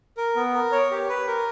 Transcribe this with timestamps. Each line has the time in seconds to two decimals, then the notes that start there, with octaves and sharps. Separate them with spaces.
0.17 A#4
0.36 B3
0.54 A#4
0.72 C#5
0.91 G4
1.09 B4
1.27 A#4